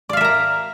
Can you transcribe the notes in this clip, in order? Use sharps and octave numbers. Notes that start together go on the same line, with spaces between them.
A#4 D5 E5 F5 A#5